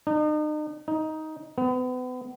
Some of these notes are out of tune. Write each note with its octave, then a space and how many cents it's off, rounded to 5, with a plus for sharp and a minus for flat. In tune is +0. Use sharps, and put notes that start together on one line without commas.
D#4 -40
D#4 +10
B3 +35